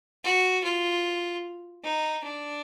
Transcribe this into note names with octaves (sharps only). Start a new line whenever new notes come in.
F#4
F4
D#4
D4